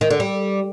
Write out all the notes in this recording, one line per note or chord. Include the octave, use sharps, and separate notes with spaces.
D#3
D3
G3